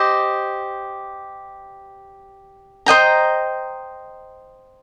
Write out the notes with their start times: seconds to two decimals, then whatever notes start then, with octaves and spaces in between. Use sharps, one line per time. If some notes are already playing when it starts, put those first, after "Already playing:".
Already playing: G4 C5 D#5
2.86 C5 D#5 G5 A#5